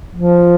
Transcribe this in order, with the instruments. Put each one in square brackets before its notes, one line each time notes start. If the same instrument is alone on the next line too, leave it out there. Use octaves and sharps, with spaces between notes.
[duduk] F3